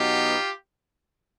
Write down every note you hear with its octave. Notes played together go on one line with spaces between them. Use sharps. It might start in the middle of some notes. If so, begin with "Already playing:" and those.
Already playing: B2 F#3 B3 D#4 F4 G4